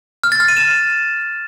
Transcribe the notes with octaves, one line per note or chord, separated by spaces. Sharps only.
F6
A6
F6
D#7
E7